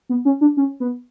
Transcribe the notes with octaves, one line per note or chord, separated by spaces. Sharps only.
B3
C#4
D4
C#4
B3